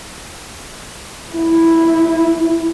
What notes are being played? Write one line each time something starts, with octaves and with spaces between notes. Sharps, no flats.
E4